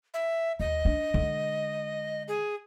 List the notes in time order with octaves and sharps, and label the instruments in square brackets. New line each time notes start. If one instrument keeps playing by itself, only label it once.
[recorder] E5
[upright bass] D#2 [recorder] D#5
[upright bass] D4
D3 G#3
[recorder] G#4